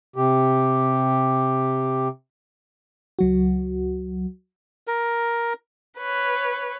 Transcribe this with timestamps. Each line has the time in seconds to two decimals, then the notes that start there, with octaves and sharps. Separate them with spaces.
0.16 C3 G4
3.19 C#2 F#3 F#4
4.87 A#4
5.98 B4 C#5